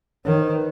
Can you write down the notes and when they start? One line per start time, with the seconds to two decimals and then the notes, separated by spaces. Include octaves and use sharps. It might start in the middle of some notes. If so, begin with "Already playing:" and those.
0.25 D#3 C#5
0.40 C5
0.53 B4